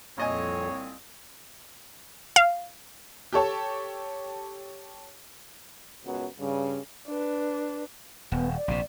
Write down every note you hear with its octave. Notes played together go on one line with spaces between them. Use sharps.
C2 F2 A#2 C4 C#5 D#5 G#5
F5
G4 A4 C#5 A5
C#2 F#2 B2 F#3 B3 C#4
G2 C#3
D4 B4
D#1 B3
D5
A#1 C3